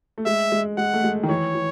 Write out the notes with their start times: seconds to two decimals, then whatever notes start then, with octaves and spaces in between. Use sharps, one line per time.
0.18 A3
0.26 G#3 E5
0.52 G#3
0.78 G#3 F#5
0.94 A3
1.04 G#3
1.23 D#3
1.29 E3 C#5
1.55 E3